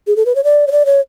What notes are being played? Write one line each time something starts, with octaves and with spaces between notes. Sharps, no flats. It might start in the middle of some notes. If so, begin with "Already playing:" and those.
G#4
A4
B4
C#5
D5
C#5
D5
C#5